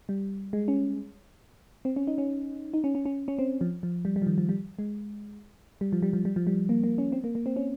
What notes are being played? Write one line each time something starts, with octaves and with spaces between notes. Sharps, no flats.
G3
G#3
C#4
C4
C#4
D#4
C#4
D#4
C#4
C#4
C#4
C#4
C4
F3
F3
G3
G3
F3
D#3
F3
G3
G#3
G3
F3
G3
F3
G3
F3
G3
A#3
A#3
C#4
C4
A#3
A#3
C4
C#4